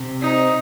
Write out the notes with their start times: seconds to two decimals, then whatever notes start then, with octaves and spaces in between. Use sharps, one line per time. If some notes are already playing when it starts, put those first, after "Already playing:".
Already playing: C3 C4
0.22 D#4